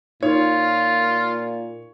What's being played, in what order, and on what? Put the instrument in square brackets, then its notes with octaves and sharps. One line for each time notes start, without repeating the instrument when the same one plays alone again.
[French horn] A#2 [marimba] D#4 [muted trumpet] F4 [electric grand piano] C#5